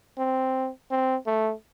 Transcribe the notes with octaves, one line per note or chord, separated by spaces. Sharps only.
C4
C4
A3